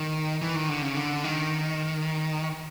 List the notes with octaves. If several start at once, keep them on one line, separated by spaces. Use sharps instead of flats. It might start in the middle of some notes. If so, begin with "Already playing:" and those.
Already playing: D#3
E3
D#3
D3
C#3
D3
D#3